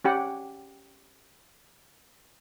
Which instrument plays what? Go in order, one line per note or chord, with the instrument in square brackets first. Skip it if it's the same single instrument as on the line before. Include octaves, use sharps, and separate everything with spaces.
[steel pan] C#4 G4 F#5